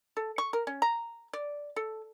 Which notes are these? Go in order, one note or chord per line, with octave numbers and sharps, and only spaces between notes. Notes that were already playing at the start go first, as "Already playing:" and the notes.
A4
C#6
A#4
C#4
A#5
D5
A4